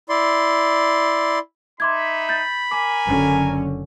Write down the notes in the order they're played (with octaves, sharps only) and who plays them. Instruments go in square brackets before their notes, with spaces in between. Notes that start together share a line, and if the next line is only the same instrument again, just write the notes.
[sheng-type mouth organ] E4 D5 C6
[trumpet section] D#4 E5 [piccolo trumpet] B5 [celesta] C6 D6 G#6
[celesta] G6 A6
[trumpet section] A#4 G#5 [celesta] D6 B6
[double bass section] F#1 D3 C#4